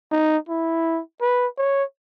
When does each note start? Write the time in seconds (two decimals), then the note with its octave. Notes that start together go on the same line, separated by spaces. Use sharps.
0.12 D#4
0.49 E4
1.21 B4
1.58 C#5